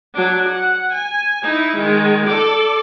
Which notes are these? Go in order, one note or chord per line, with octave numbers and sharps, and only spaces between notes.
F#3 D4
F#5
G#5
D#4 E4
D#3 G#3
A4 D5